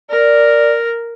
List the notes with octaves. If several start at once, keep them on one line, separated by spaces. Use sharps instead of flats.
A#4 D5